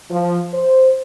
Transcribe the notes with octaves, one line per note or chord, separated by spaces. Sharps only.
F3
C5